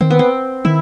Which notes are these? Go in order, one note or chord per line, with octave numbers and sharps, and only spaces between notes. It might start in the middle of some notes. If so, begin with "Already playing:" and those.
D#3 C4
B3
C4
D#3 E4